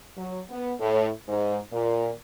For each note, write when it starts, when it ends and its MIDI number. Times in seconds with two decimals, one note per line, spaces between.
0.17 0.39 54
0.50 0.72 59
0.80 1.09 45
1.28 1.57 44
1.72 2.11 46